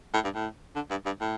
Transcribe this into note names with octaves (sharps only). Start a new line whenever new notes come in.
A2
G2
A2
D3
G2
G2
A2